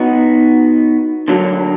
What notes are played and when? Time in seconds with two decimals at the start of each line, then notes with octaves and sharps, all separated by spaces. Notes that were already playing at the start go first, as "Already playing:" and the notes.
Already playing: B3 D#4 F#4
1.28 D3 F#3 A#3